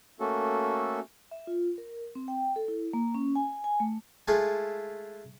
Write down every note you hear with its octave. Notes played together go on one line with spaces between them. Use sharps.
A3 A#3 C#4 F#4 A4
E5
F4
A#4
C4
G5
A4
E4
A#3
C#4
G#5
G#5
A3
G#3 A3 E4 F4 G#4 A4